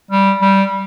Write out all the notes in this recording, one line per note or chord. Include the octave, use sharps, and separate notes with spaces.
G3
G3